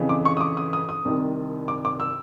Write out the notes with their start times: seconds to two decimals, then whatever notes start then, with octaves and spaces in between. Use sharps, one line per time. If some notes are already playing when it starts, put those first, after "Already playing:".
Already playing: F2 C#3 E3
0.09 D6
0.25 C#6
0.37 D#6
0.41 D6
0.57 D#6
0.73 D#6
0.89 D#6
1.05 C2 C3 D#3
1.68 D6
1.85 D6
2.00 E6